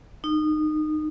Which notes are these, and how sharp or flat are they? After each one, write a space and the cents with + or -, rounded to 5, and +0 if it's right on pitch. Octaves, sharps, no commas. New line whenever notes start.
D#4 -25